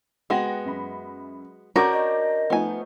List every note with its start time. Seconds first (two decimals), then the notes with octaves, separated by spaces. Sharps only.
0.30 G#3 B3 F#4 F#5 G5 A#6
0.65 F#2 B5
1.76 C#4 D4 F#4 A#4 A#5 D6 G6
1.92 D#5
2.50 F3 A3 B3 D#4 G#5